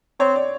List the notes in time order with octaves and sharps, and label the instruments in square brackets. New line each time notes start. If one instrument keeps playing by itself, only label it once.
[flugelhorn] C4 [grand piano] C#5
[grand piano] D5